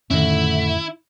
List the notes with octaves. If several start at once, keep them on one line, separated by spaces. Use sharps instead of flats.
F2 A2 D3 D#3 A3 C#4 E4